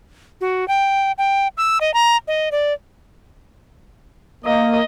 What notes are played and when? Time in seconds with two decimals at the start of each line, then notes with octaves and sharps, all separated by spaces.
0.41 F#4
0.68 G5
1.18 G5
1.58 E6
1.81 D#5
1.94 A#5
2.28 D#5
2.52 D5
4.45 A#3 D#5